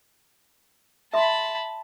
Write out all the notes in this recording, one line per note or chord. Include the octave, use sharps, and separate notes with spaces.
E5 A5 B5 C6